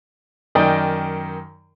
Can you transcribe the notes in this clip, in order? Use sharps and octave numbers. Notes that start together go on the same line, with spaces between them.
F#2 D#3 D5 D#5 G5